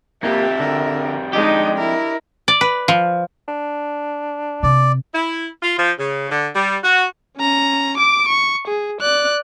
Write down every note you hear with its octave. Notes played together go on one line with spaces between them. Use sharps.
F2 G3 A#3 G4 E5
D3 A#4
G#3 D4 D#4 G4 D#5
E4 A#4
D5
B4
F3
D4
C3 D5
E4
F4
F3
C#3
D3
G3
F#4
C#4 A#5
D6 D7
C#6
G#4
D5 F#6